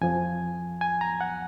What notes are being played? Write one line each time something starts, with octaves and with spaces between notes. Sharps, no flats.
F2 F3 G#5
G#5
A#5
F#5